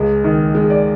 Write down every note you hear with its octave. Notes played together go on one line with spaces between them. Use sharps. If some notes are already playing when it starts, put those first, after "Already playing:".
Already playing: C#2 G#3
D#3
G#3
D5